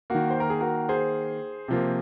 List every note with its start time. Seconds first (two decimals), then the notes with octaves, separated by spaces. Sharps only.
0.10 D#3 A#3 F#4
0.30 C5
0.40 A#4
0.50 G#4
0.61 F#4 A#4
0.89 G#4 C5
1.68 C3 F3 A#3